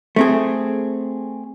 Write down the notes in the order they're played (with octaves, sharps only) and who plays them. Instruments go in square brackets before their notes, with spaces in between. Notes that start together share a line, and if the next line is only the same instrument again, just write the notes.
[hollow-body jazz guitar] A3 C4 G#4